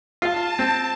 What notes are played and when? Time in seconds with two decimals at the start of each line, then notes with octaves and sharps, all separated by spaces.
0.22 F4 F5 A5
0.59 C4